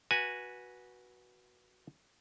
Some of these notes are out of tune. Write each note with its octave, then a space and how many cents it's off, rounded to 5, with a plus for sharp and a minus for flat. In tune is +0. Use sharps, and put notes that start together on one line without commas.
F#4 +0 B4 -20 G#5 +0